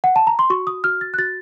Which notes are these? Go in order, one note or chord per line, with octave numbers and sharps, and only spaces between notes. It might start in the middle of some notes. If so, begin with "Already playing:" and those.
F#5
A5
A#5
C6
F#4 C#6
D#6
F#4 F6
A6
F#6
F#4 A6